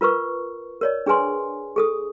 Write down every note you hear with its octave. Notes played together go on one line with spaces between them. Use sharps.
F4 A#4 B4 C#6
A#4 C#5 D5
D4 G#4 B4 G#5 C6
G#4 A4 D#6